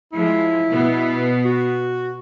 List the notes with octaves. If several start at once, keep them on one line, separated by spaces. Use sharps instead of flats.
F3 G#3 E4
B2 B3
F#4